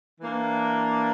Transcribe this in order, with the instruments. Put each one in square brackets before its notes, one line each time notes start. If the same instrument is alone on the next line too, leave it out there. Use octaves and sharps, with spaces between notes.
[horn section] E3 A#3 D4